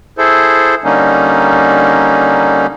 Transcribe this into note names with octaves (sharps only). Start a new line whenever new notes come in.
E4 G#4 A4 C5
D3 G3 A#3 C#4 D#4